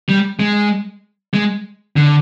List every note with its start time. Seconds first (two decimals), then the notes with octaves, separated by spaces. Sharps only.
0.09 G3
0.40 G#3
1.34 G#3
1.96 D3